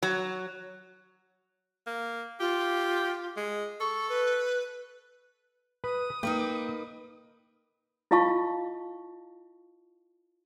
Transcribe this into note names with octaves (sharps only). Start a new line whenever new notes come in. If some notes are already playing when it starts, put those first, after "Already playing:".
F#3
A#3
F4 G4
G#3
A4 C#6
B4
B4 D#6
A#3 D#4 A#4 B4 G5
E4 F4 D#5 F5 A5 C#6